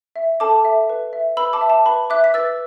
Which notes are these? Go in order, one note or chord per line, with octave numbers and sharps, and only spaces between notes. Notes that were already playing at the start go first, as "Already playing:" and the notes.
E5
A4 A5 D6
E5
B4
E5
B4 B5 E6
A5 D6
E5
A5
B4 B5
E5 D6 F#6
B6
B4 E6 A6